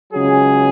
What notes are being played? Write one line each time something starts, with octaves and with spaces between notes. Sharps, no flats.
C#2 C#3 F#3 G#4